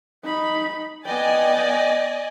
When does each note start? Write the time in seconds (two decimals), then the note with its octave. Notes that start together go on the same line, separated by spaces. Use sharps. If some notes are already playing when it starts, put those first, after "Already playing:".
0.23 D#4 B5
1.05 B3 D5 D#5 G5 G#5